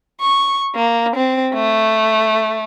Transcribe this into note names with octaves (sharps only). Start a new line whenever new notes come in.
C#6
A#3
C4
A3